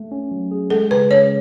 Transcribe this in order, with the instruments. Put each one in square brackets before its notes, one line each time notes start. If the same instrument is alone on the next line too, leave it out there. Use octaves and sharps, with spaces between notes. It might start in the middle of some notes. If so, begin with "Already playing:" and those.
Already playing: [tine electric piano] A3
C#4
F#3
G#4
[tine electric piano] G#3 [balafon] A4
[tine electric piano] C#3 [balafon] B4
[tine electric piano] C#4 [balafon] C#5